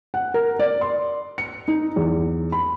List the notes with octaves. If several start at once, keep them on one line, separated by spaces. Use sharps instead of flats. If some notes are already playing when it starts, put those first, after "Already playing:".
F#5
A#4
D5
C6
C#7
D#4
E2
B5